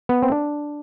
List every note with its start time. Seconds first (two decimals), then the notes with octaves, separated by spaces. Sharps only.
0.09 B3
0.23 C4
0.32 D4